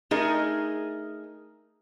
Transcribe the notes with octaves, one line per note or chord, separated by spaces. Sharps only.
A3 D#4 G#4 A#4 D#5